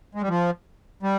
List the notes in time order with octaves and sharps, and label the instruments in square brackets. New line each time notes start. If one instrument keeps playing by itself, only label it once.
[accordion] G#3
G3
F3
G3